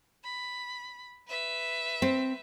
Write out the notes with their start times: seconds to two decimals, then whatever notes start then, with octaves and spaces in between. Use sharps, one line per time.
0.24 B5
1.27 B4 E5
2.02 C4